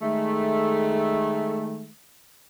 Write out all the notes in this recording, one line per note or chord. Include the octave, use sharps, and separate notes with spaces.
D#3 G#3 A3